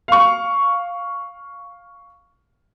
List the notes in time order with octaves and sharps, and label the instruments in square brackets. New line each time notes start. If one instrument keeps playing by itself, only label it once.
[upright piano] F5 C#6